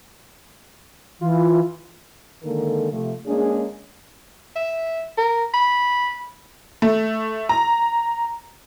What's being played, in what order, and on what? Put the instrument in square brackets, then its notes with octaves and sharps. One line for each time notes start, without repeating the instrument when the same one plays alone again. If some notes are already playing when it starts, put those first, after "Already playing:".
[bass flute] E3 [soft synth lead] F4
[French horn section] D3 D#3 G#3 A#3 A4 A#4
C3 F3 A3
G#3 A#3 C#4 D4 G#4
[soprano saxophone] E5
A#4
B5
[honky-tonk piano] A3
A#5